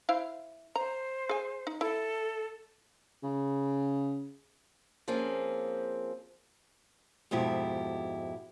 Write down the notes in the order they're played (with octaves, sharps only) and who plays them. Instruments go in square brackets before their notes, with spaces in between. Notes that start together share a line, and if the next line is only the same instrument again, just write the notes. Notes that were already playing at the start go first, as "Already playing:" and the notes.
[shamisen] E4 C5 F5
[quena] C5 [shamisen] A#5
[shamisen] G#4 G#5
D#4
[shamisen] E4 [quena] A4
[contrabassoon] C#3
[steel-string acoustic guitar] F3 A#3 C4 C#4 G#4
F2 G#2 B2 E4 G4